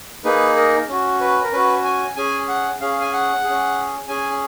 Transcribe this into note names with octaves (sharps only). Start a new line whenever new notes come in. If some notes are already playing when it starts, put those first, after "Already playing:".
A#3 D#4 G#4 B4
A#4
C#4 F#4
B4
A#4
C#4 F#4 B4
G#5
C#4 G#4 G#5
F#5
C#4 G#4 F5
G#5
F#5
G#4
C#4
C#4 G#4 G#5